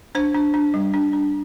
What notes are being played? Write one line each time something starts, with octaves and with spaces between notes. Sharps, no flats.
D4 C5
D4
D4
G3
D4
D4